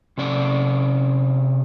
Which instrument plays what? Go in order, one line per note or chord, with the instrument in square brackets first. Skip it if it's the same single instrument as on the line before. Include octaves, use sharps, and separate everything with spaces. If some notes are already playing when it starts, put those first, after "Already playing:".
[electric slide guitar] C3 C#4 D5